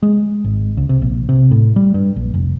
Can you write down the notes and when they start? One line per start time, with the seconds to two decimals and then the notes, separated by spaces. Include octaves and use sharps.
0.03 G#3
0.45 G#1
0.77 C#2
0.89 C3
1.02 A#1
1.29 C3
1.51 A2
1.76 G3
1.94 G2
2.16 A#1
2.34 F1